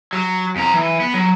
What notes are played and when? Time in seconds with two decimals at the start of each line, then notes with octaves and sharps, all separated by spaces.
0.13 F#3
0.56 F2 A#5
0.74 E3
1.00 B3
1.14 F#3